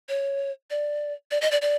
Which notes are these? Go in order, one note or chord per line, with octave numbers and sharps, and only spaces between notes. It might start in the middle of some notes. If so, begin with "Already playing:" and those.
C#5
D5
D5
D#5
D5
D5